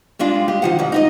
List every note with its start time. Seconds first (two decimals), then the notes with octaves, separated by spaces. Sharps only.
0.19 G3 G#3 D4 F4
0.48 G4
0.62 D#3 F3 F#5
0.79 G#2 G3
0.92 D#4 E4 D#5